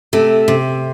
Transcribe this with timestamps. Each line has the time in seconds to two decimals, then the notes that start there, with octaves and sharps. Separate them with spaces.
0.13 C3 A3
0.48 C3